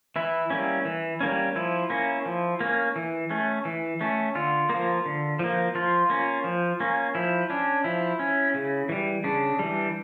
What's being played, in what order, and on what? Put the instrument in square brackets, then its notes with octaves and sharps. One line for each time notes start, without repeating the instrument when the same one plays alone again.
[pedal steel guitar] E3 E4
G3 A#3 C#4
E3
G3 A#3 C#4
F3 E4
A#3 C#4
F3
A#3 C#4
E3
A3 C#4
E3
A3 C#4
D3 F4
F3 A#3
D3
F3 A#3
F3 F4
A#3 C#4
F3
A#3 C#4
F3 E4
C#4 D4
F3 E4
C#4
C#3
E3 G3
C#3 D4
E3 G3